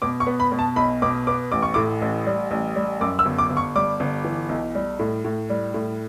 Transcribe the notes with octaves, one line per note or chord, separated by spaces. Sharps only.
B2 D6
C#6
B3
B5
B2
A5
B1 B5
B2 D6
B3 D6
A1 D6
C#6
A2 D6
A1
G3
A1
G3
F#2 D6
E6
G1
D6
G1
C#6
G3 D6
G1
E3
B1
G3
A2
A2
G3
A2